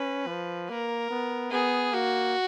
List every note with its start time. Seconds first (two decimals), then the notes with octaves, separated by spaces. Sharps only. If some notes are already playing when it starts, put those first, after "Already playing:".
Already playing: C#4 B4
0.27 F3
0.69 A#3 A#4
1.10 B3
1.51 B3 G#4
1.92 A#3 F#4